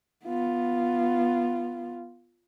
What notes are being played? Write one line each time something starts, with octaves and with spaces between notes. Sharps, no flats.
B3 F4